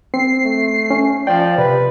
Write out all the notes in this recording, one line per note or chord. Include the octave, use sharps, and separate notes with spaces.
C4 C7
A3
C#4
F3 D5 G5
C3 B4